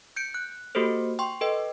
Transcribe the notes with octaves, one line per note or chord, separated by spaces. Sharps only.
G6 C#7 D7
F#6
A#3 F#4 G4 A4 C5
G5 C6 C#6
A4 B4 D#5 G5